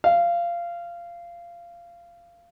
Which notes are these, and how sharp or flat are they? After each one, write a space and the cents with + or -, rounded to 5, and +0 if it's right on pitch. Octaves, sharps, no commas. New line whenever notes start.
F5 -20